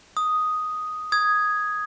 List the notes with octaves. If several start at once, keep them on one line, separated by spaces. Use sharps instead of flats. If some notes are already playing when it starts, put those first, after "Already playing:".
D#6
D#6 G#6